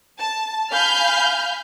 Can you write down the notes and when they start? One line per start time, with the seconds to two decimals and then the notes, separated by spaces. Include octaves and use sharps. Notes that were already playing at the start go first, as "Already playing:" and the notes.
0.20 A5
0.71 F5 G#5 B5 F6 G6